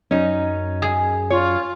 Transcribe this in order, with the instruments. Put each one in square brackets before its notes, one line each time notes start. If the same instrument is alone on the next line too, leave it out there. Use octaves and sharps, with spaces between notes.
[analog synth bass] F#2 [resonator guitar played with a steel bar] C#4 D#4
[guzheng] G#4
[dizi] F4 [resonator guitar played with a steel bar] C#5